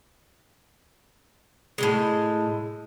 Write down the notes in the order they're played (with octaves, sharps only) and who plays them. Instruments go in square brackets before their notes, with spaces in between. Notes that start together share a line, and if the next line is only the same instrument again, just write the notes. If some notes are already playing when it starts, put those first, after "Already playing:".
[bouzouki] A2 E3 G#3